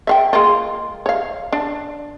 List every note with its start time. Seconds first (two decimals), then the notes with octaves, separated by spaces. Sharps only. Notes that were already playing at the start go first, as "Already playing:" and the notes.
0.07 E5 F5 G5
0.33 G#3 A#3 F4
1.06 C#5 F5
1.53 D4